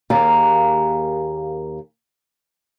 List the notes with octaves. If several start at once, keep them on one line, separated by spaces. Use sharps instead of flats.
D#2 A#3 G4 G#4 F5 A#5